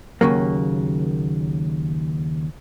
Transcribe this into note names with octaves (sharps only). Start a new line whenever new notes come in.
D#2 C#3 F#3 A#3